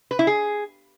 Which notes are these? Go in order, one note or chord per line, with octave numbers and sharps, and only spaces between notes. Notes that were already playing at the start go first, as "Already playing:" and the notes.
B4
E4
G#4